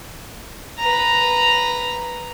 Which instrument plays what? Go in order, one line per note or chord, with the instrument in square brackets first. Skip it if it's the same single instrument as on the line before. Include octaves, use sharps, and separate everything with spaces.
[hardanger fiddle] B4 A#5